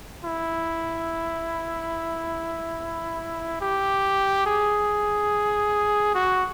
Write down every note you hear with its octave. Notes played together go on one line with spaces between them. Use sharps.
E4
G4
G#4
F#4